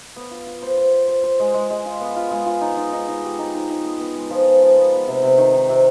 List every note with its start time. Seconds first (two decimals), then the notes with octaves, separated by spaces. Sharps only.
0.16 B3
0.31 F4
0.47 F4
0.62 C5
0.78 C5
0.93 C5
1.08 C5
1.24 C5
1.40 G#3
1.54 G#3
1.70 G#3
1.86 F4
2.01 B3
2.16 F4
2.31 G#3
2.46 F4
2.61 D#4
2.77 D#4
2.93 D#4
3.08 D#4
3.24 G4
3.39 D#4
3.55 D#4
3.69 D#4
3.85 B3
4.00 B3
4.16 G#3
4.30 F3
4.46 F3
4.62 F3
4.77 B3
4.92 B3
5.08 C3
5.23 C3
5.38 D#3
5.54 D#3
5.69 C3